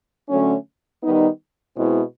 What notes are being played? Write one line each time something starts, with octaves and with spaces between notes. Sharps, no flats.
D3 F#3 A3 C#4
D#3 G3 B3 D#4
B2 G#3 C4 E4